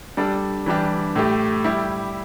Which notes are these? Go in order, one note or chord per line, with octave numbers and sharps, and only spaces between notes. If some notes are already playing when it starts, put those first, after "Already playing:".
G3 D4 A4
E3 G3 D4 G4
A2 A3 G4
G3 E4 G4